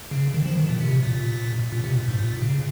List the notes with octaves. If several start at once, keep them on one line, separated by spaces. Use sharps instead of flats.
C#3
D#3
F3
D#3
A#2
C3
A#2
A#2
C3
A#2
G#2
A#2
C#3